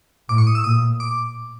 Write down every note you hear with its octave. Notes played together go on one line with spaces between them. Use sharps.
A2 D6
C#6
D#6
E6
A#2 D#6
D6